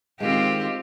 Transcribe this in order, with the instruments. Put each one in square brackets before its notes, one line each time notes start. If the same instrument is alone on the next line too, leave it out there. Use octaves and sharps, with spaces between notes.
[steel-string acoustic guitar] D#3 G#3 [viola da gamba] C4 F4 G4